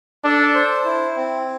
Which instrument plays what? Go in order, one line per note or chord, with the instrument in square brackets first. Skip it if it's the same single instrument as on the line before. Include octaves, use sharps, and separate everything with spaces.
[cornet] D4 [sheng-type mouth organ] A4
[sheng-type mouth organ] C5
E4
C4